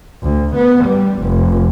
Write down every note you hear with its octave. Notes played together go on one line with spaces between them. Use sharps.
D2
B3
G3
F1